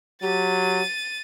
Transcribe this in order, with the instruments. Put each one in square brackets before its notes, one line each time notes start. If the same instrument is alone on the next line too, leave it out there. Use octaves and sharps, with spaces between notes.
[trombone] F#3 [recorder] G4 [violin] A6 D#7